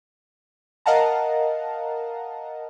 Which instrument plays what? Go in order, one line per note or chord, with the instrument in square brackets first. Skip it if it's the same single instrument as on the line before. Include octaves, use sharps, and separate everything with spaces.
[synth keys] A#4 D#5 F5 F#5 A5 A#5